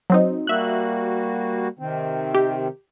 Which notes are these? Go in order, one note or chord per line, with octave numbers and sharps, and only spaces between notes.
F#3 C4 D#4
G3 A#3 F#4 E5 F#6
C3 D#3 C4
G4